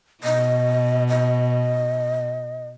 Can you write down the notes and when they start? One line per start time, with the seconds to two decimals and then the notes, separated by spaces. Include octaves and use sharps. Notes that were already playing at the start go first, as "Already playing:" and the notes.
0.24 B2 D#5
1.09 D#5